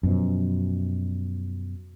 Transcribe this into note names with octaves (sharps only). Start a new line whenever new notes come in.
F#2 B2 F3